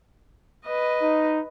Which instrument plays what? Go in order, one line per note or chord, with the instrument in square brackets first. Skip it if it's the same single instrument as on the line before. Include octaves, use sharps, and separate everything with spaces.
[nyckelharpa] B4 D#5
[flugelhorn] D#4